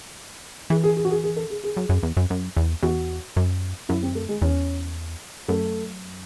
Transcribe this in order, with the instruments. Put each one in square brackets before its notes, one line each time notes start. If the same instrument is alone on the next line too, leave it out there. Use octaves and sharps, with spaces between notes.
[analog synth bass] E3 [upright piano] G#4
[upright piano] G#4
G#4
F#4
G#4
G#4
A4
G#4
G#4
[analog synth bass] F#2
F#2
E2
F#2
F#2
E2
[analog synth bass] E2 [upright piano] F#4
[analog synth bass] F#2
[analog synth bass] F#2 [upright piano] E4
[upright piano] C4
A3
G#3
[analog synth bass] E2 [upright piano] C#4
[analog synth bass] F#2 [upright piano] A3